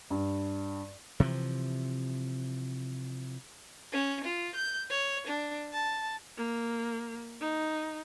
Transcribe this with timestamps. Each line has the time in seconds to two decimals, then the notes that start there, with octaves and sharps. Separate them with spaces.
0.10 G2
1.20 C3 E3 F3
3.92 C#4
4.24 F4
4.55 G6
4.90 C#5
5.27 D4
5.73 A5
6.37 A#3
7.41 D#4